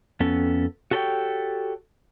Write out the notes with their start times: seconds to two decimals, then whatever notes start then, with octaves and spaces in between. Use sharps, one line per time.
0.20 F2 B3 C#4 A4
0.91 F#4 G4 A4 B4 C#5 G5